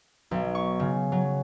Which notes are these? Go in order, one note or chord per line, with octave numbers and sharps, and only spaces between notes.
B1
C#6
C#3
F#3